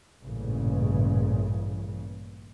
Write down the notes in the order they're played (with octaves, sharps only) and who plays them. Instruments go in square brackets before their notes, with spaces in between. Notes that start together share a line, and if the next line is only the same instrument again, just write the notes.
[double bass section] A1 G2 A#2 C#3